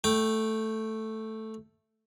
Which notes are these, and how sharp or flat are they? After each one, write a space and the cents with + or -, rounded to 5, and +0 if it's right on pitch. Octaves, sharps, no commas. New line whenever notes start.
A3 +0 G5 +0